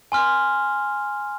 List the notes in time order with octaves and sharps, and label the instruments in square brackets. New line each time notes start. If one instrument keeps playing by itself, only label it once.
[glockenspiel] G#5 C6 F6